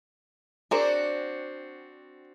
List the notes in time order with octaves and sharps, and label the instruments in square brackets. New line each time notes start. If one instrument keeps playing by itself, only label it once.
[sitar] C4 D4 F#4 [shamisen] G#4 A#4 C5 [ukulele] D5